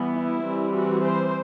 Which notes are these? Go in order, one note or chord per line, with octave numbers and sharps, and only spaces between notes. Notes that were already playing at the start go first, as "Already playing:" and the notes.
Already playing: E3 G3 B3
E4
E3 G3 C4
F#4
C5